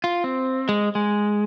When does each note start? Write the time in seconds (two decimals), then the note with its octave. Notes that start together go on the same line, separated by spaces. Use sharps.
0.04 F4
0.24 C4
0.69 G#3
0.95 G#3